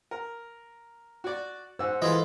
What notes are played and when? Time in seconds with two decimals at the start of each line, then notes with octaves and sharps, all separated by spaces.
0.11 A#4
1.24 F#4 D5
1.79 G#2 C5 F#5 E6
2.02 E3 G#3 E4 F4 A4 D#5